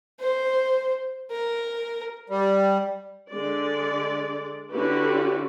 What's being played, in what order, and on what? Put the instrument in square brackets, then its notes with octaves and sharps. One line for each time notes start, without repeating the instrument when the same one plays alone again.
[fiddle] C5
A#4
[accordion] G3
[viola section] D3 G#3 D5
D3 C#4 E4 F#4 G4 B4